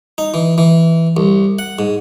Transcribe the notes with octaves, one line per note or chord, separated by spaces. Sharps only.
D#4
E3
E3
C2
F#5
G#2